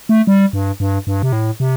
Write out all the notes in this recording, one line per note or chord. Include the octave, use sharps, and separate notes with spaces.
A3
G3
G2
G2
G2
C3
A2
C3